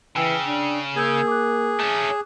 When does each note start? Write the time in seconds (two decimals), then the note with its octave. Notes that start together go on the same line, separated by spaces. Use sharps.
0.16 C#3 E3 G5 E6
0.47 D4
0.96 A#3 G#4 E6 G6 G#6
1.27 D6 F#6
1.80 A3 C#4